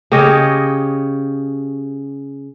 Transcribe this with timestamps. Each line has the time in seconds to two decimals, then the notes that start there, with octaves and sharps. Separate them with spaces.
0.12 C#3 G4 C#5 D#5